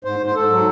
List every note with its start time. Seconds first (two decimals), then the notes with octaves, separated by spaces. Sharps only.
0.04 G#2 C5
0.19 G#2
0.26 C5
0.35 G#2 A4
0.50 F#3